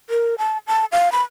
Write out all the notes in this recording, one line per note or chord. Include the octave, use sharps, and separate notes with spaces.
A#4
A5
A5
F5
B5